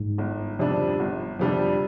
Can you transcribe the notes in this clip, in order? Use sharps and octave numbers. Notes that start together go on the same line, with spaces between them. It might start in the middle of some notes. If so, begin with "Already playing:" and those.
Already playing: G#2
G1
F2 C3 G3 D4
G1
F2 C3 G3 D4